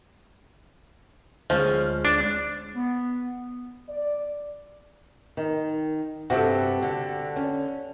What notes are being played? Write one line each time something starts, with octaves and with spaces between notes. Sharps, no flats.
D2 F3 G#3 C#4
D4
B3
D5
D#3
G2 C3 F#4 G4 A4
D3
C#4